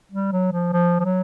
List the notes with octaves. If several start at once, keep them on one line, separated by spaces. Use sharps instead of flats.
G3
F#3
F3
F3
F3
F#3